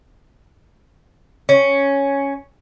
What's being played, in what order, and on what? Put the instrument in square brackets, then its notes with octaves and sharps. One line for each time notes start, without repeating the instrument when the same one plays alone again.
[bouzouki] C#4